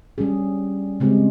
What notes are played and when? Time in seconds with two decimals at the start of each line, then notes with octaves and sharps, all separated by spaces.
0.18 G3 C#4 G#4
1.00 C#3 G#3 C4 G4